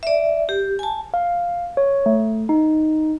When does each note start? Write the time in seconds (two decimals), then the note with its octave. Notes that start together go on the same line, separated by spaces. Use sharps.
0.03 D5 E5
0.49 G4
0.79 G#5 A5
1.14 F5
1.77 C#5
2.06 A3
2.49 D#4